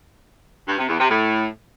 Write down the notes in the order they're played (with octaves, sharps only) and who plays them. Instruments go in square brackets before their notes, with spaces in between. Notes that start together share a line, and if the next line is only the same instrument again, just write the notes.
[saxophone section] G2
C3
E2
C3
A2